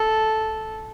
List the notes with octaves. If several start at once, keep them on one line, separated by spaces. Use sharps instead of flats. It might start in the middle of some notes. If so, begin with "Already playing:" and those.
Already playing: A4